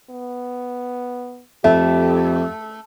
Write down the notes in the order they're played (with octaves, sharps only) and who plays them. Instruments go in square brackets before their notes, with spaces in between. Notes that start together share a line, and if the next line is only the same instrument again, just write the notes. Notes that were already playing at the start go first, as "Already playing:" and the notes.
[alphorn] B3
[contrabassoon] F2 [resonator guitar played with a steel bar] A3 [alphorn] G4 [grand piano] E5